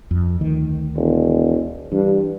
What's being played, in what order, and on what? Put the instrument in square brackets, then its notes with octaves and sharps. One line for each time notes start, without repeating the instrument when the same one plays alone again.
[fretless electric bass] F2
D2 D#3
[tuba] E1
[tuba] G2 [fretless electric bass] E3